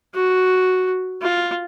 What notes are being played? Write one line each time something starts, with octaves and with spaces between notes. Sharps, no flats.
F#4
F4